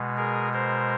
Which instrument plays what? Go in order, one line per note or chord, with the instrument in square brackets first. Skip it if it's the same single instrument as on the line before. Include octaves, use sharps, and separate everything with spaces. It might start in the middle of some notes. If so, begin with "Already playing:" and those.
Already playing: [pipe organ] B2 G#3
G#4 A#4
A#4 C5